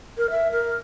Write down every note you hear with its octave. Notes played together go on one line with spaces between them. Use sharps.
A#4
E5
A#4